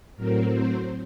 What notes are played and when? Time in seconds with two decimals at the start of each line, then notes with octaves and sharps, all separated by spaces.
0.16 A2 F#3 C4 A#4
0.50 C5